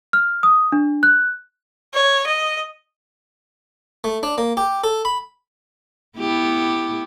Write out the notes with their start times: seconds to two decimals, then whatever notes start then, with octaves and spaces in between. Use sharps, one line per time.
0.13 F6
0.43 D#6
0.72 D4
1.03 F#6
1.94 C#5
2.27 D#5
4.04 A3
4.23 D4
4.38 A#3
4.57 G4
4.84 A4
5.05 B5
6.18 B3 E4 G4